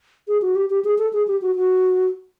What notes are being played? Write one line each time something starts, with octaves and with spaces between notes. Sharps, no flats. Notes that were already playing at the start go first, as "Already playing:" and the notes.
G#4
F#4
G4
G4
G#4
A4
G#4
G4
F#4
F#4